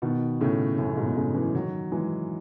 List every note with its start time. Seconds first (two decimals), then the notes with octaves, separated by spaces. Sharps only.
0.02 B2 D#3
0.41 A2 C#3
0.78 F#2 A2
0.97 G#2 B2
1.16 A2 C#3
1.35 C#3 E3
1.55 D#3 F#3
1.92 E3 G#3